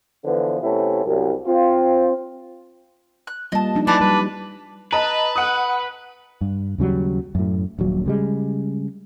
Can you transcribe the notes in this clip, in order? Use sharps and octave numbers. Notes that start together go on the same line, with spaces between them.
D3 E3 F3 B3
C3 A3 B3 C#4 E4
C2 F#2
C4 F4
F#6
G3 A#3 F4 D#5 A5
F3 D4 D#4
E3 F#3 D4 D5 A5 D6
G3 B4
B4 D#5 A5 A#5
F#5 D#6
G2
D#2 C#3 F#3 G3
F#2 A2
D#1 A#1 F#3
C#3 G3 G#3